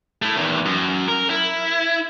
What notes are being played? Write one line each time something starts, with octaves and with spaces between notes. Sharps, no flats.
A3 E4
E2 D#3
F#2
A#4
E4